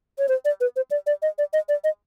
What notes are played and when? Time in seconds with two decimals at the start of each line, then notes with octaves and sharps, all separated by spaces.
0.18 C#5
0.28 C5
0.45 D5
0.61 B4
0.76 C5
0.91 D5
1.07 D5
1.22 D#5
1.38 D5
1.53 D#5
1.69 D5
1.84 D#5